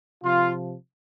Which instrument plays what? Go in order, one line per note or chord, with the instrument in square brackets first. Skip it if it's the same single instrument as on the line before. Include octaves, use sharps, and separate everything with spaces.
[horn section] C3 F3 F4